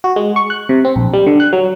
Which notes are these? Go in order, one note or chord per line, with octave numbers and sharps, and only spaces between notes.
F#4
G#3
C#6
F#6
C3
C4
A#1
G3
D3
F#6
F#3